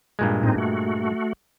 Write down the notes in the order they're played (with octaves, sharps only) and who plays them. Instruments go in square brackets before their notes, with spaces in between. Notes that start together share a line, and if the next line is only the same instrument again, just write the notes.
[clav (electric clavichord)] G2 A#2 G#3
[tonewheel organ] A2 C4 D#4
A3 F#4